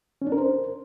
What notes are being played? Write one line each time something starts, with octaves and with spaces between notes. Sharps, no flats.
C#4
D4
A#4
C5